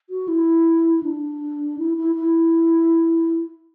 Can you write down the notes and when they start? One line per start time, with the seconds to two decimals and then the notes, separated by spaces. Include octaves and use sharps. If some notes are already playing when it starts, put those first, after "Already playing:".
0.10 F#4
0.28 E4
1.03 D4
1.79 E4
1.97 E4
2.16 E4